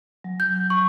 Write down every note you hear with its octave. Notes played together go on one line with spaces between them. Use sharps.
F#3
G6
C#6